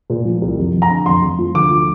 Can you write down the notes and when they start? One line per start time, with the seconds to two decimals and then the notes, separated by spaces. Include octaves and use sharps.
0.10 A#2
0.25 F3
0.41 C2
0.57 F2
0.74 F2
0.82 A#5
0.90 D3
1.06 F2 C6
1.22 F2
1.39 F3
1.55 D2 D6
1.71 F3